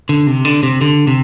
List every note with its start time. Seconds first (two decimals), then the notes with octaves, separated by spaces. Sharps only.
0.09 D3
0.27 C3
0.45 D3
0.63 C3
0.81 D3
1.07 C3